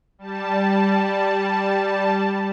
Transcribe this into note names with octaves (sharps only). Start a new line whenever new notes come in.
G3 A5